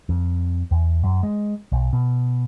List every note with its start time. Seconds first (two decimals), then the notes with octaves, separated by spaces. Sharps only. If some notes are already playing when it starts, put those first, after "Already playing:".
0.09 F2
0.71 E2
1.03 F#2
1.23 G#3
1.72 B1
1.93 B2